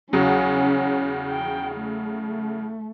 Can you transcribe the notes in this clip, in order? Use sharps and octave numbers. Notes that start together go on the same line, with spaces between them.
E2 C#3 F#3 C#4
G5
A3